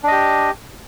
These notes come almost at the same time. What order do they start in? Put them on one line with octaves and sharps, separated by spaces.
D4 D#5 G4